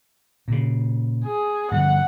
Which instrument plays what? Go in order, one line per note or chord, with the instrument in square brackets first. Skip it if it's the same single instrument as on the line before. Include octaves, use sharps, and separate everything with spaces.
[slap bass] A#2 C#3
[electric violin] G#4
[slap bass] G2 D3 F3 [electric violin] F#5